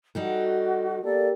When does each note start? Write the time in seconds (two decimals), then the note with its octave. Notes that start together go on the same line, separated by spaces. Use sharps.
0.15 G3 D#4 F#4 A4
1.03 A#3 G4 A4 D5